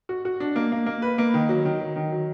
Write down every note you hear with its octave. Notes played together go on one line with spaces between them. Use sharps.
F#4
F#4
D4
A#3
A#3
A#3
B4
A#3
D#3
F#3
D#3
F#3
D#3
F#3